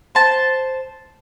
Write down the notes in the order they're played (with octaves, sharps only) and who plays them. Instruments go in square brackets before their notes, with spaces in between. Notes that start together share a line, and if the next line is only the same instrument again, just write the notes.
[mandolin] C5 A5